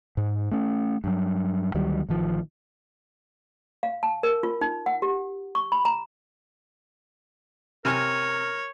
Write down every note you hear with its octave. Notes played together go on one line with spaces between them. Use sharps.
G#2
A3 C#4
G2 F#3
D2 D#3 F#3 G3
A1 D#3 F3
F5
A5
A#4
F4
D#4
F#5
G4
C#6
B5
A#5
C3 A#4 C#5 G#5 F6